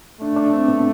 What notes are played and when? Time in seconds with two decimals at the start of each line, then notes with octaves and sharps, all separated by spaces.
0.21 A3 D4
0.36 D4
0.53 C4
0.68 B3